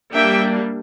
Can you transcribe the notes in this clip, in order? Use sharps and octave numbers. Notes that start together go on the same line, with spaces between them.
G3 A#3 D4 E5 G5